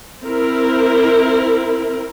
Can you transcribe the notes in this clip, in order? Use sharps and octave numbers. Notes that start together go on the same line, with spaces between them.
C4 E4 A#4